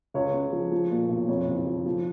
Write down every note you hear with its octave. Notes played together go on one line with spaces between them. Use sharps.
C#2 C#5
C#3
F3
F3
A#2
B1
F2 C#5
F#1
F3
F3